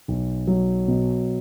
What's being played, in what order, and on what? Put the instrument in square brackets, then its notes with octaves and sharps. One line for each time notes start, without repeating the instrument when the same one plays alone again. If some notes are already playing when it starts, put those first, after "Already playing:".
[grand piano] B1
F#3
B2